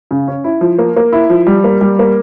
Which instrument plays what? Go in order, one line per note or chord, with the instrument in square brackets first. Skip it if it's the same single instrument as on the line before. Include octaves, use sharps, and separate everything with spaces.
[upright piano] C#3
C#4
E4
F3
A#3
A#3
E4
F3
G3
A#3
G3
A#3